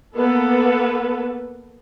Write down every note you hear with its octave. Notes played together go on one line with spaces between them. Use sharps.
A#3 B3 A4 B4